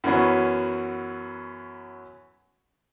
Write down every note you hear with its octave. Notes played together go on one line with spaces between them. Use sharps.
F#2 E3 F#3 B3 C#4